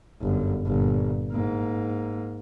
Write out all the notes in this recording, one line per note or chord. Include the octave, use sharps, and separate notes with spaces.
G1 F#2
G1 A#2
G#2 A#3